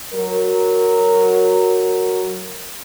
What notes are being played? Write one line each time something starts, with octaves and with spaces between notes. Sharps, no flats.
F#3 A#4